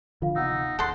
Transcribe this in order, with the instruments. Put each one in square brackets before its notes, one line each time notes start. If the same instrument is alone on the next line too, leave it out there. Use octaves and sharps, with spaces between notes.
[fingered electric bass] D3 E3 F3 [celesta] F4 F5
[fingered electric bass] D1 C3 B3 [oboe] D#4 [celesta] F#5 E6
[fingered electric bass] D#1 [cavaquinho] A4 C6 [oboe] F#5 [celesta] D#6